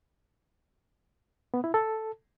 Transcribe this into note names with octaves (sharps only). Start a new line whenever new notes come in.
B3
E4
A4